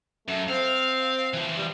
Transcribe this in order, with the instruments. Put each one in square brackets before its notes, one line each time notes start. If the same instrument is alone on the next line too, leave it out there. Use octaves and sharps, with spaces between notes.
[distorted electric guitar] F#2 [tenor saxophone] A3
[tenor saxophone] C4 [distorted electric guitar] F5
[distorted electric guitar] E3 F3
[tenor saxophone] G3